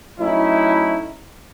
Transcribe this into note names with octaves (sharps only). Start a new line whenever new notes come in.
F#3 A3 C#4 D#4 E4